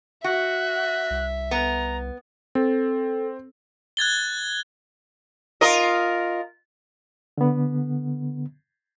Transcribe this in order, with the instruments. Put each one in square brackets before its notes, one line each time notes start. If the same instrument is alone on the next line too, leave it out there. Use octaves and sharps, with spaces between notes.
[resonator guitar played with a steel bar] F#4 [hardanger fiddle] E5 [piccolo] F#6
[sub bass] C2
[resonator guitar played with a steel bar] B3 [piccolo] A#5
[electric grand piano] C4 [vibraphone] A4
[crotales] F#6 G#6 A6 G7
[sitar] F4 A#4 D#5
[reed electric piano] D3 B3